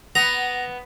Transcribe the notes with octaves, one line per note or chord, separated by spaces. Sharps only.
B3 A#5